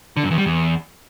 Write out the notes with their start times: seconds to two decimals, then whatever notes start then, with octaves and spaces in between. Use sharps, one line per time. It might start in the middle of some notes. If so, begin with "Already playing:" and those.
0.17 D3
0.24 F#2
0.31 E2
0.38 G3
0.45 E2